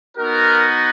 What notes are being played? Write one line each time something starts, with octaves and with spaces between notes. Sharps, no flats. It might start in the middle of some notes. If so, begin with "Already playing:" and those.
B3 D#4 F#4 A#4